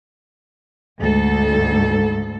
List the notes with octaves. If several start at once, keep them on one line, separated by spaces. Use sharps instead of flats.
D2 G#2 A4